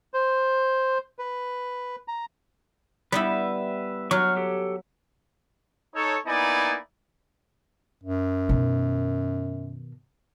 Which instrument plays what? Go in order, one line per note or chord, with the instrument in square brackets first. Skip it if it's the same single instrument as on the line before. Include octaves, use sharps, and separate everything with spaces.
[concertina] C5
B4
A#5
[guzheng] G3 B3 E4 [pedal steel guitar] B4 E5
[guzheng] F#3 [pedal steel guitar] C#6 F6
[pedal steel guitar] G4 A4 C#5
[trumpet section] D#4 A4 C#5
A#3 B3 D#4 E4 D5 G#5
[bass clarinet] F#2
[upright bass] B2 D#3